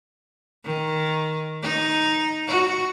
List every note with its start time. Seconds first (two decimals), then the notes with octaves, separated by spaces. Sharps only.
0.65 D#3
1.62 D#4
2.47 F#4